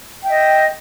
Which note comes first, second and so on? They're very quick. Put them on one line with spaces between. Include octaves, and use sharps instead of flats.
G5 E5 D#5 G6